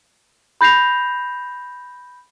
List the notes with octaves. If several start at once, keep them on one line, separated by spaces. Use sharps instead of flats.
B5 G6 A#6 C7 F7